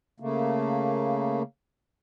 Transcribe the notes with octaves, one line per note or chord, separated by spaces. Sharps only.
C#3 A3 A#3